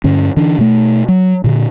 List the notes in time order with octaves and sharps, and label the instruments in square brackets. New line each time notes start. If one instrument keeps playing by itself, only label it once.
[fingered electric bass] G2 D3 C#4
D3 E3 D4
B2 A3
F#3
A#2 D3